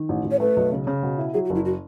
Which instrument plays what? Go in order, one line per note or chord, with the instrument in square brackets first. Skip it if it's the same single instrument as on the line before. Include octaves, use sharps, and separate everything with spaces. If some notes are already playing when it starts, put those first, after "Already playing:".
Already playing: [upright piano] D#3
A1
A1
[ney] C#5
[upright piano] A3 [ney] B4
[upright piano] B1
C#3
C#3
B2
E4
[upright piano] F#3 [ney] G#4
[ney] F#4
[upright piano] F#1
[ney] E4
F#4